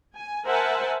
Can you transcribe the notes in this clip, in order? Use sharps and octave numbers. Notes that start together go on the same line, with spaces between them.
G#5
A#4 C5 E5 F#5 G#5 A5